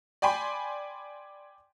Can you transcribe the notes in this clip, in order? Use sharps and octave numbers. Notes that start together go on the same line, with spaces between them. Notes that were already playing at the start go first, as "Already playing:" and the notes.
D5 G5 G#5 B5 C6